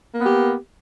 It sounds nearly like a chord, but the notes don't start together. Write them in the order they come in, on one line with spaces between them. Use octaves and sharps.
A#3 B3 G4